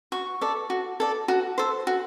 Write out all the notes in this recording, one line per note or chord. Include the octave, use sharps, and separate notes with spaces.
F#4 C#6
A4 D5
F#4
A4 D5
F#4
A4 C5
F#4